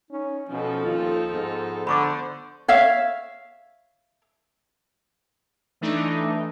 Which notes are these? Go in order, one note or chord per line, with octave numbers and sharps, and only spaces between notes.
C#4 D#4
B2 F3 C#4 D#4 A4
D#2 F4
G#2 B3
D3 C5 D5 B5 C#6 D6
C#5 E5 F5
E3 A3 D4 D#4